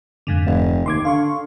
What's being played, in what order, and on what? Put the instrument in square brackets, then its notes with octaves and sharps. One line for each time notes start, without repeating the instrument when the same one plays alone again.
[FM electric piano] F2 G#2 D3
[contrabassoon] F1
[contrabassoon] D#2 [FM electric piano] C6 D6 G#6
[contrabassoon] D3 [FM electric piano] F5 C6 C#6